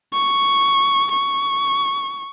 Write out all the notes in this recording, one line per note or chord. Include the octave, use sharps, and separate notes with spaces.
C#6
C#6